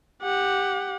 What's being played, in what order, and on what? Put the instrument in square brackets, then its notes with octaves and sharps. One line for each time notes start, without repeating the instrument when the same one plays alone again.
[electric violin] G4 F#5